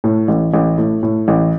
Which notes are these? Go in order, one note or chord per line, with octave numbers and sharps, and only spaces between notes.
A2
A1
A1
A2
A2
A1